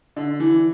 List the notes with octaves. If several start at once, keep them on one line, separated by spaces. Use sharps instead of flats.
D3
E3